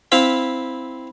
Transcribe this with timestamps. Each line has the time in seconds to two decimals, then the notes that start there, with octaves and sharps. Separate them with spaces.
0.12 C4 E4 F5 B5